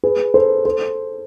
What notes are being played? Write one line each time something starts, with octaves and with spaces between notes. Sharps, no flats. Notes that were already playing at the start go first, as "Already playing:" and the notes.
G#4 B4
A4 C5
A4 C5